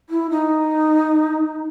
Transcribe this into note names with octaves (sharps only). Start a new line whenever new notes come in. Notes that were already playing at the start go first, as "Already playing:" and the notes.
E4
D#4